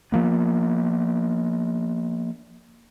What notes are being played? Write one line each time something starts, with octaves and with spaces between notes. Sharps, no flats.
F3 A#3 B3